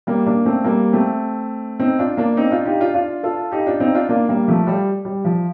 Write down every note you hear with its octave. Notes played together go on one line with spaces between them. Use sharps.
G3 A#3
A#3 D4
A3 C4
G3 A#3
A3 C4
C4 D#4
D4 F4
A#3 D4
C4 D#4
D4 F4
D#4 G4
D4 F4
D4 F4
F4 A4
D#4 G4
D4 F4
C4 D#4
D4 F4
A#3 D4
G3 A#3
F3 A3
G3
G3
F3